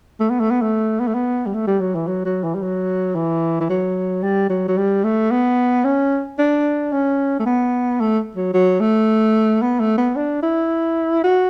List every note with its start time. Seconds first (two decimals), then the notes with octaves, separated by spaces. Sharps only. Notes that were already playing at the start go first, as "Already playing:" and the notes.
0.20 A3
0.30 B3
0.40 A3
0.50 B3
0.62 A3
1.00 B3
1.07 A3
1.14 B3
1.46 G3
1.54 A3
1.67 G3
1.81 F#3
1.95 E3
2.07 F#3
2.25 F#3
2.44 E3
2.55 G3
2.62 F#3
3.15 E3
3.60 E3
3.70 F#3
4.23 G3
4.50 F#3
4.68 F#3
4.78 G3
5.04 A3
5.31 B3
5.85 C#4
6.39 D4
6.92 C#4
7.40 A3
7.46 B3
8.00 A3
8.36 F#3
8.54 F#3
8.80 A3
9.62 B3
9.80 A3
9.98 B3
10.16 D4
10.43 E4
11.24 F#4